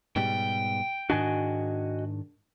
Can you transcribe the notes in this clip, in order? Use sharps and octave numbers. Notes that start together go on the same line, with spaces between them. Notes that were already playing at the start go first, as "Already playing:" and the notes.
G#2 B2 G3 G5
G#2 D#3 D4 F#4 D#5 G#5